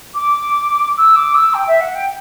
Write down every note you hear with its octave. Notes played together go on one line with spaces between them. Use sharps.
D6
E6
D6
E6
G5
E5
F#5
G5